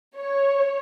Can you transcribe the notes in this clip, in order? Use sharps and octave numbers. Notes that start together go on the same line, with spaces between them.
C#5